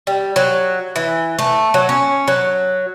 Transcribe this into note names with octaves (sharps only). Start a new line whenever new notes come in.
G3
F#3
E3
A3
F#3
C#4
F#3